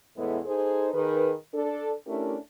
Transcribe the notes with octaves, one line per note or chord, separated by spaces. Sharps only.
E2 A2 G#3 A3 B3 E4
D#4 G#4 A4 C5
D#3 G#4 B4
D4 A4
A3 C#4 D4 E4 G4 A#4